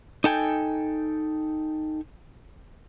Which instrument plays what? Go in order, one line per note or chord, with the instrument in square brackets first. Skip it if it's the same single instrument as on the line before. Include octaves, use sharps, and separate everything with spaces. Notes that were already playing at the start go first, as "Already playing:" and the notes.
[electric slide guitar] D#4 A4 G5 G#5